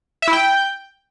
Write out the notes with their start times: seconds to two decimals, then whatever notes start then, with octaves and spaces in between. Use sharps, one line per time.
0.22 E5
0.28 E4
0.33 G5